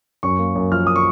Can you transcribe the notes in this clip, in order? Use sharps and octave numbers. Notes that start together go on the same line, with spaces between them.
F#2 C#6
A#3
F#2
F3 F6
D#6
C#6